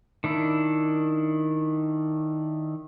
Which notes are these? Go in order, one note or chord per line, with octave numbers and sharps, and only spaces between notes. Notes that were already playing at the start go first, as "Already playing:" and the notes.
D#3 D4 E4